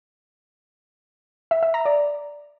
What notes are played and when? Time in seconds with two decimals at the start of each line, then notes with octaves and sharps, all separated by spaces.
1.51 E5
1.63 E5
1.74 A#5
1.85 D5